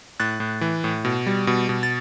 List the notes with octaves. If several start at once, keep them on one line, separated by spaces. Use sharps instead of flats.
A2 F#6 A6
A2
E3
A2
B2
G3
B2
B2
A6